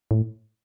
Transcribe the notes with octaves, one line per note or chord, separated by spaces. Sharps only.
A2